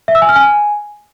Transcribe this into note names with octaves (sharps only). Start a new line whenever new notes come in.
E5
E6
G#5
F6
G#5